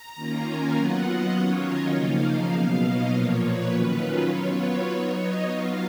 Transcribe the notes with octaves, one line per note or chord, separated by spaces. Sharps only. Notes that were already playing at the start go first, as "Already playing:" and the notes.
Already playing: A#5
D#3 A#3 C#4 F4
G#5
F#3 B3 F4 F#5
D#5
D#3 F#3 C#4 F4 C#5
D#5
C#3 F3 A#3 D#4 F5
F5
B2 F#3 B3
D#5
A#2 F3 A#3 C#5
B4
D#3 F#3 C#4 F4
F#3 B3 F4 C#5
B4
F#3 B3 D#4 C#5
D#5
F#3 B3 F4 F5